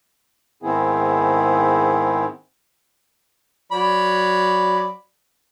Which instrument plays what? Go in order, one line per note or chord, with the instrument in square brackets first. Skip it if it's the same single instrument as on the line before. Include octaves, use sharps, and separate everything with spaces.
[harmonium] G#2 D#3 B3 C4 E4 G#4
[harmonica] F#3 D5 B5